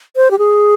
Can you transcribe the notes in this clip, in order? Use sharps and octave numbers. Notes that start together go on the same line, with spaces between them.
C5
G4
G#4